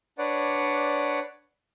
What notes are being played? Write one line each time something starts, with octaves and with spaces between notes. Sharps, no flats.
D4 B4 C#5 D5 F#5